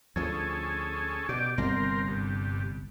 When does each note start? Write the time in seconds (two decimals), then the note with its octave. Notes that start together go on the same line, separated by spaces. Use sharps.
0.16 D2 F3 C#4 G#4 A4
1.29 B2 G4 D5
1.58 G1 C2 C4 A#4
2.08 G2